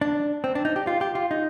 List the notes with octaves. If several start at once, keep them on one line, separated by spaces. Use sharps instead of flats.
D4
C4
D4
D#4
G4
F4
G4
F4
D#4